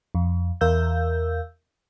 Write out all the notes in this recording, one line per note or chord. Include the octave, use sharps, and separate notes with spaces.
F2
E2 A#4 F5 E6 G6